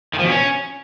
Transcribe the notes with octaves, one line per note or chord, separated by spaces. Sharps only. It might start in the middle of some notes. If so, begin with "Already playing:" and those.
D#3
F3
B2
C#4